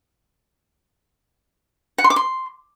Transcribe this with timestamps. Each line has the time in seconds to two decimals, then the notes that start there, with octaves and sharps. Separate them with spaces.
1.98 F#5
2.04 C6
2.10 D6
2.16 C6